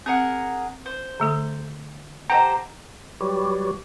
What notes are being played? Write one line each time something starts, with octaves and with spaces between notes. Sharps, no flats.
C4 G#4 A#4 F#5
C5
D3 A3 A4
G4 A4 C5 D#5 F#5 A#5
F#3 G3 G4 B4 C#5 D5